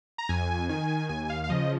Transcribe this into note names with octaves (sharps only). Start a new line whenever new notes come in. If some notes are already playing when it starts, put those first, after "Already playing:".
A#5
F2 G#5
D#3 G#5
D#2 G#5
G#5
F5
F5
C#3 F3 D#5